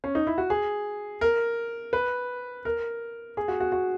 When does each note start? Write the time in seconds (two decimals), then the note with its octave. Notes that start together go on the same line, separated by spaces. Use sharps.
0.04 C#4
0.15 D#4
0.27 E4
0.38 F#4
0.50 G#4
1.21 A#4
1.93 B4
2.65 A#4
3.37 G#4
3.48 F#4
3.60 F#4
3.72 F#4